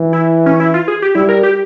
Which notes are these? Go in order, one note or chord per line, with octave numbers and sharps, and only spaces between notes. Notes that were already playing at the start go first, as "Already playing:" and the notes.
Already playing: E3
E4
C#4
E4
F4
G#4
G4
G3 E4
A#4
G4